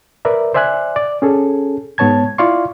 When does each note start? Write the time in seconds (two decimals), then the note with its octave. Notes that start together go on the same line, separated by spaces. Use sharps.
0.25 A#4 B4 D5 E5
0.54 C5 D5 E5 G#5 F#6
0.96 D5
1.22 C#4 G#4 A4
1.98 G#2 B3 C#5 A5 G#6
2.38 E4 F4 D5 F5 C6 C#6